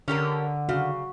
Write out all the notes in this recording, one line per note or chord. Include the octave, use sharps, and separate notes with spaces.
D3 C#4 G4 A#4
C#3 F#4